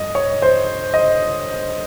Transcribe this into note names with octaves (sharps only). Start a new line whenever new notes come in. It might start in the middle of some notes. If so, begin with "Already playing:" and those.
Already playing: G2 D#5
C#5
C5
D#5